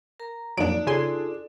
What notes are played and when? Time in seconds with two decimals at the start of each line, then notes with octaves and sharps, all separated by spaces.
0.20 A#4 A#5
0.57 F2 A#2 F#3 D4 D#4 D5 D7
0.87 C#3 F4 G#4 A4 G#5 C6